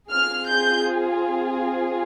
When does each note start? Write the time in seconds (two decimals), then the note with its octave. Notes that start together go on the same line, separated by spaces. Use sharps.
0.10 C4 F4 G#4 F6
0.48 G6